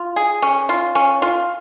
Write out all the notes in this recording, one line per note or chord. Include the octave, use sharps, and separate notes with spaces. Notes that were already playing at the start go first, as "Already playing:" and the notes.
Already playing: F4
G#4
C#4
F4
C#4
F4